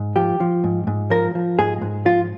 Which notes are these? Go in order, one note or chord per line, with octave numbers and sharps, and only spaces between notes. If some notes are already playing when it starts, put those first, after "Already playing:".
Already playing: G#2
F3 G4
F3
G#2
G#2
F3 A#4
F3
G#2 G#4
G#2
F3 F4